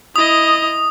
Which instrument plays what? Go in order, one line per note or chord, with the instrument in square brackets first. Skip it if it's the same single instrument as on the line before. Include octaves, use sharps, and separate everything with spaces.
[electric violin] E4 D#5 [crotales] D#6